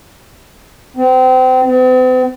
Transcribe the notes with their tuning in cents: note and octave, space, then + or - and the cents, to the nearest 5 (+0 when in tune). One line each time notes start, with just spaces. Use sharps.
C4 -30
C4 -45